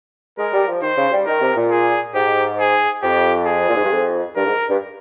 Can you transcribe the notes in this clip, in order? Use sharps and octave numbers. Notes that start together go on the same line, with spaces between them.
G#3 A#4
G3
F3
D#3 C5
C#3
G3
D#3 A#4
C3
A#2
G#4
G#2 G4
G#4
F2 G4
G#4
A#2
G#2
G2
F2
G2 A#4
G#2
G2